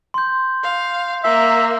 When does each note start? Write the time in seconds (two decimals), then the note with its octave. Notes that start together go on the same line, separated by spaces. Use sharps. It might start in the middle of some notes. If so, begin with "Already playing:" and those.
0.14 C6 G6
0.63 F5
1.24 A#3 E5